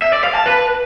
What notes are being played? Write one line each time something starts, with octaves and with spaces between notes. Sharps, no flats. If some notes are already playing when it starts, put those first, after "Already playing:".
E5
D5
F5
A5
B4